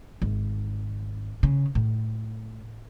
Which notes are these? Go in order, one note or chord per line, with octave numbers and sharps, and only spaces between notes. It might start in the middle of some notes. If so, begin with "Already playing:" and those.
G#1
C#3
A2